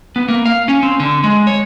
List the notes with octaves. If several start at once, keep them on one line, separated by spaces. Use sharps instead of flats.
B3
A#3
F5
C#4
C4
D3
G#3
C#5